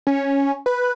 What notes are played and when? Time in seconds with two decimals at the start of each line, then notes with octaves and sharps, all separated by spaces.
0.07 C#4
0.66 B4